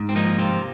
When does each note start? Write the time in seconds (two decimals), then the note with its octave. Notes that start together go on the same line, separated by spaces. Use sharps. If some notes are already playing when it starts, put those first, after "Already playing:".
Already playing: G#2
0.09 C4
0.15 F3 A#3 D#4
0.38 C3 C4 F4